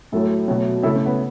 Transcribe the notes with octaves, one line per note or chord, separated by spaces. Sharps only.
A2 F#3 A3 E4 A4
B2 F#3 A3
C#3 A3 E4 A4
C#4
B3